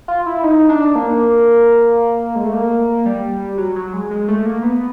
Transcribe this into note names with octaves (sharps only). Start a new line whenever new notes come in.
F4
E4
D#4
D4
A#3
G#3
A3
A#3
G3
F#3
F#3
G#3
G#3
A3
A#3
B3